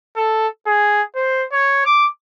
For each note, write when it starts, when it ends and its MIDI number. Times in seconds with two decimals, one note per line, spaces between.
0.17 0.47 69
0.67 1.02 68
1.16 1.44 72
1.52 1.82 73
1.86 2.07 86